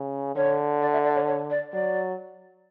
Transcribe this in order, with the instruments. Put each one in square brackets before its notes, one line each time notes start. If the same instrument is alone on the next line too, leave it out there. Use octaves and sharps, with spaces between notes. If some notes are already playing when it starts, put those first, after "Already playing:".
Already playing: [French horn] C#3
[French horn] D3 [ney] C#5
[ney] D5
E5
D5
C#5
C#5
D5
[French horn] F#3 [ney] D5